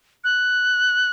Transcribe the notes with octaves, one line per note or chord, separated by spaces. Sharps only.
F#6